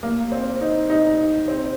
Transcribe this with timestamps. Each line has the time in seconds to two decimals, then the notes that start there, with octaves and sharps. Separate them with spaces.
0.03 A#3
0.32 C4
0.61 D#4
0.90 D#4
1.18 D#4
1.48 C4